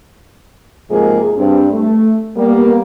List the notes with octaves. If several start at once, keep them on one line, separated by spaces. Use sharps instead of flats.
G#2 C3 F3 G#3 A#3 G#4
G2 C4
A3
G3 A#3 B3